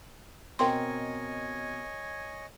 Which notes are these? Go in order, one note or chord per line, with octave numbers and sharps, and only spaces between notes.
B2 C4 A#4 C#5 D#5 G5 G#5 C6